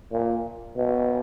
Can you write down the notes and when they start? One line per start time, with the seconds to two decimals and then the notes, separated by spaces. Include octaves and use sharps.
0.12 A#2
0.77 B2